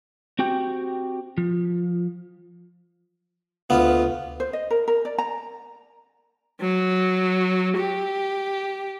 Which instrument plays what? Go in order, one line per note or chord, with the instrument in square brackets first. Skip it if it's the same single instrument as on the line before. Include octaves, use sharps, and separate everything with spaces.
[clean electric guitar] C4 F#4 G4 G5
F3
[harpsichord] D2 B3 [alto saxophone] F4
[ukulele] C5
D#5
A#4
A#4
D5
A#5
[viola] F#3
G4